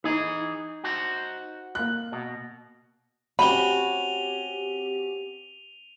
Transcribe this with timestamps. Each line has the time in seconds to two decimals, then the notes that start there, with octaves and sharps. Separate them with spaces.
0.04 E3 D#4 G#4
0.84 F#4 C5
1.75 A#3 F#6
2.12 B2
3.39 C4 C#4 F#4 G4 B5 D#7 F7 G7